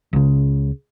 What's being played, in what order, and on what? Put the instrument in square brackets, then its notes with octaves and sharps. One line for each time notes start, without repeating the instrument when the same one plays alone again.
[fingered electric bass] C#2 C#3